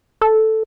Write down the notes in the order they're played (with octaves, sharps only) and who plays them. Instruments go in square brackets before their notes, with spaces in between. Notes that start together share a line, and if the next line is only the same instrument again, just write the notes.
[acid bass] A4